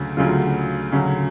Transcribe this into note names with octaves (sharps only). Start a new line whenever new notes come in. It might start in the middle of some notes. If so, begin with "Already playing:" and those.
Already playing: D2 C#3 F#3
D2 C#3 F#3 F4
D2 C#3 F#3